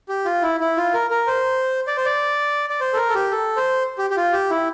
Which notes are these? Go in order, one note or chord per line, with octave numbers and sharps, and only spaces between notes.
G4
F4
E4
E4
F4
A#4
A#4
C5
D5
C5
D5
D5
C5
A4
A#4
A4
G4
A4
C5
G4
G4
F4
G4
E4